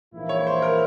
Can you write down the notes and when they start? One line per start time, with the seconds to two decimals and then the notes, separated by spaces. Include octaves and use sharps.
0.13 A#1 G#2 E3 A#3 E4
0.29 C#5
0.47 C5
0.62 A#4